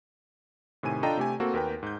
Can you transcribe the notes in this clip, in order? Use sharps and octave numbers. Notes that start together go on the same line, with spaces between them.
A2 C3 D#3 G#5 D#7
D4 F4 A4 D#5 G5 A#5
C3 A3 G4 G#5
A#3 C4 F#4 A4
D#2 A#4 B4 G5
G#2 G6